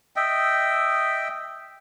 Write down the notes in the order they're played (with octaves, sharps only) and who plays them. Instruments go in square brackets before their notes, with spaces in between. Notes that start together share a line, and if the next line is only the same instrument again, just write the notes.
[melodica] D#5 E5 G5